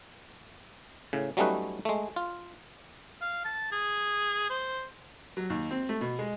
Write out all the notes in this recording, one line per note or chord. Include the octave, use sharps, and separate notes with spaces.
A2 C#3
F#3 G3 A3 C#4 D#4 B4
G#3 A3
F4
F5
A5
G#4
C5
F#3
D#2
C4
A3
B2
G#3